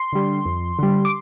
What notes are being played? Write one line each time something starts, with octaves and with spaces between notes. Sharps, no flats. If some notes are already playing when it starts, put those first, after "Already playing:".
Already playing: C6
D3 G3
F2
D3 G3
D6